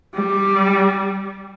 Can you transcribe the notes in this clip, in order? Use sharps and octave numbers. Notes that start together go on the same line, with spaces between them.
G3